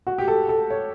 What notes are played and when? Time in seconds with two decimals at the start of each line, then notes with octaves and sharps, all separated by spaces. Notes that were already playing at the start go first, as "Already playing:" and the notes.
0.07 F#4
0.18 G4
0.28 A4
0.49 A4
0.70 C#5